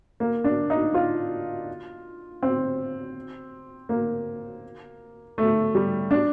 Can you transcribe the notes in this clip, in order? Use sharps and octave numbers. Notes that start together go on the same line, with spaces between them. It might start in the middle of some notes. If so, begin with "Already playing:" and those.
A#3
D4
D#4
F4
C4
A#3
A3
G3
D4